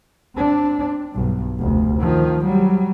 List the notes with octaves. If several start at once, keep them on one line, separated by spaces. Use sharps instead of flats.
C4 D4
B1 G2
F1 D2
D#3 F3
F#3 G3